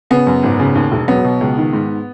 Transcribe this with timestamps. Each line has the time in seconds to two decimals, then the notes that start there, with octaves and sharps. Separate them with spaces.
0.10 C#3 B3
0.27 F#2
0.43 G#1
0.59 C#3
0.75 D#2
0.92 E1
1.08 F#3 B3
1.24 B2
1.41 C#2
1.57 D#3
1.73 G#2